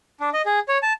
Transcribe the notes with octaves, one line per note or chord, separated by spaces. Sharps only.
D4
D#5
G#4
C#5
A5